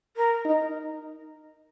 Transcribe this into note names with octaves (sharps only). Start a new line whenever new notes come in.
A#4
D#4